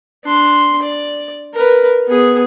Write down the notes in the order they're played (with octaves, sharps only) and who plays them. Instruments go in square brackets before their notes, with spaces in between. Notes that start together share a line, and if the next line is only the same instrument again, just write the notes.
[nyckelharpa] D4 C6
D5
A#4 B4
B3 G#4